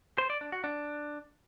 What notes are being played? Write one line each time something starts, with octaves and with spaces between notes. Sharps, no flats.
C5
D5
D4
F#4
D4